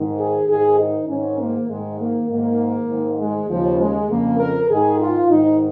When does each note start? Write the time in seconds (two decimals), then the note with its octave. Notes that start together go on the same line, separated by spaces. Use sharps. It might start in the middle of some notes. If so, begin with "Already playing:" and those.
Already playing: G#2 D#3
0.19 G#4
0.48 G#2 D#3 G#4
0.78 D#4
1.08 G#2 D#3 C#4
1.39 A#3
1.69 G#2 D#3 G#3
1.99 A#3
2.29 G#2 D#3 A#3
2.89 G#2 D#3
3.19 G#3
3.49 D#2 C#3 F3
3.79 G#3
4.09 F2 C#3 A#3
4.39 A#4
4.69 G#2 D#3 G#4
4.99 F4
5.29 G#2 D#3 D#4